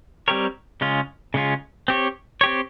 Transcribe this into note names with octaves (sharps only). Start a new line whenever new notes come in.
G3 C4 G4 A#4 C#5
C#3 G#3 C#4 F4
C#3 G#3 C#4 F4
C4 G4 C#5
C4 G4 C#5